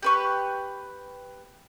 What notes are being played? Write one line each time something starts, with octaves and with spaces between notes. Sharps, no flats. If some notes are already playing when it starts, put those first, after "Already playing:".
G4 B4 C#6